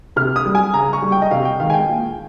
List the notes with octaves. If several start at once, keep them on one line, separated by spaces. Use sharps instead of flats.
C3 F6
D#6
G3
G#5
C#3 A#5
C#6
G3
G5
D#5
C3 F5
G5
D#3 G#3 F5
G#5
G5
A#2